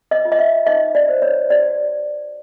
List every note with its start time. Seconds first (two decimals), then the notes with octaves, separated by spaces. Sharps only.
0.11 D#5
0.25 F4
0.32 D#5
0.39 E5
0.67 D#4 D#5
0.95 D5
1.09 C5
1.22 C#5
1.50 F#4 D5